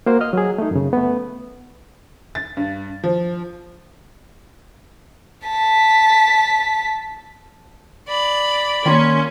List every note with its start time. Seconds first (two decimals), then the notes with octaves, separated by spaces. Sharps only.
0.06 A#3 F#4 C5
0.21 D#5 F6
0.33 F#3 G#4
0.58 A3 D#4
0.71 F#2 C#3
0.93 A3 B3
2.35 A6
2.57 G2
3.04 F3
5.46 A5 B6
8.08 D5 B5
8.86 D#3 A#3 C#4 F4